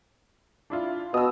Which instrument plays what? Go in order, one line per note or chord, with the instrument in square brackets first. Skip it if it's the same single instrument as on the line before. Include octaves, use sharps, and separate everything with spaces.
[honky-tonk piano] D4 E4 F4
[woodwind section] B2 [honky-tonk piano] D#6 E6